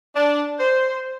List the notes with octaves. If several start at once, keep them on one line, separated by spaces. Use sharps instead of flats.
D4
C5